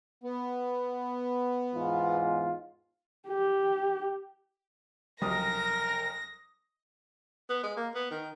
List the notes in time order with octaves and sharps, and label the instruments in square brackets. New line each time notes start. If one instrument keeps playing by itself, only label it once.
[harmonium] B3
[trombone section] E2 G#2 F4
[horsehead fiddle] G4
[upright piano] F1 D#6 [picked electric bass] C#2 F#3 G3 [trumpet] A#4 [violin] A#6
[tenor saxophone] B3
G#3
A#3
B3
D#3